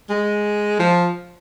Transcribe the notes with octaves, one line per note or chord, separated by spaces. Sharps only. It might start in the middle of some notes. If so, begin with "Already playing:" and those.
G#3
F3